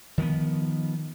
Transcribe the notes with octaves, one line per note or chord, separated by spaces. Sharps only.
D#3 F3 B3